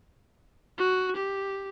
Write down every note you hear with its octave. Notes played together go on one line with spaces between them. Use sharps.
F#4
G4